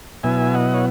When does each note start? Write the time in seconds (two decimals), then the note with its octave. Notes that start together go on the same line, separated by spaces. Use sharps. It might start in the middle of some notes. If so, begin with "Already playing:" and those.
0.23 B2 F#3 B3 E4 E5 G#5
0.54 D#5 F#5
0.74 C#5